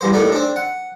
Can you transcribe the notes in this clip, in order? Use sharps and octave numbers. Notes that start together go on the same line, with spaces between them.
E2 G2 C5
D#2 A2 A3 D4
C4 D4
F#5